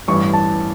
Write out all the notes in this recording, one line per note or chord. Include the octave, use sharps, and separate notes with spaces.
A1 G2 E3 C#6
A5